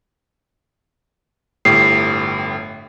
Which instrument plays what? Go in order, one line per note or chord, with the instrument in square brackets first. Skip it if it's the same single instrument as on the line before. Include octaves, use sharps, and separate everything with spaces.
[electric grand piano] G1 A2 G4 [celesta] C7